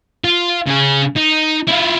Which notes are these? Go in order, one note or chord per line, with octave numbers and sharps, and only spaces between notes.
F4
C#3 G#4
D#4
E4 F4